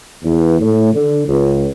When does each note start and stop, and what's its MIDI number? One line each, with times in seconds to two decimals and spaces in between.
0.22 0.57 40
0.60 0.89 45
0.93 1.23 50
1.27 1.66 37